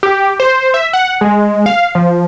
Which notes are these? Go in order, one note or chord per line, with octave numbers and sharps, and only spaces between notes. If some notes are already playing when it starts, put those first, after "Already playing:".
G4
C5
E5
F#5
G#3
F5
F3